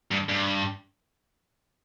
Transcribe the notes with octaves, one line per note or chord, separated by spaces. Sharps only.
G2
G2